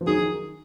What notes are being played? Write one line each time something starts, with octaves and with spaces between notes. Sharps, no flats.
F3
D#3 F#3 G#4
D#3